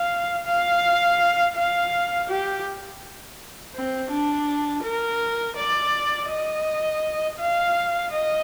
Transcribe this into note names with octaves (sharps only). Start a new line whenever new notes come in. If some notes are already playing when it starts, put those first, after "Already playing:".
Already playing: F5
F5
F5
G4
C4
D4
A#4
D5
D#5
F5
D#5